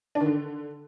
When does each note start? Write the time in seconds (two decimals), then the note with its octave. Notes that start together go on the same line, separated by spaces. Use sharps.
0.15 D4
0.21 D#3
0.26 D3